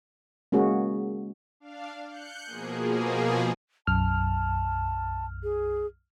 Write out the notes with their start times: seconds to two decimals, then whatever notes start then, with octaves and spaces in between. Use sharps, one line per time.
0.52 G#3 A#3 C#4 F#4 G#4
1.60 D4 F5
2.07 F#6 G6 C#7
2.45 B2 F3 A#3 G#4
3.87 B1 F#2 A5 F6
5.43 G#4